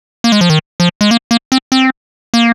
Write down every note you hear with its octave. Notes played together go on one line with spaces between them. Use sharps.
A#3
G#3
F3
D#3
F3
G#3
A#3
A#3
C4
C4
A#3